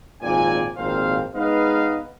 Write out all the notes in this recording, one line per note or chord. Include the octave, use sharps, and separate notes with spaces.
G#1 A#2 F3 C4 D5 G#5
G#1 F2 A#2 C4 C5 F5
G#3 B3 D#4 B4 D#5 F5